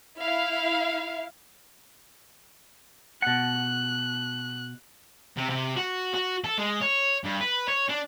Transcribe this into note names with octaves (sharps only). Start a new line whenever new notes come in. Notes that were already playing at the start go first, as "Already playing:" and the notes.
E4 E5 F5
B2 F#5 F#6
C3
C3
F#4
F#4
A4
G#3
C#5
G2
B4
C#5
D4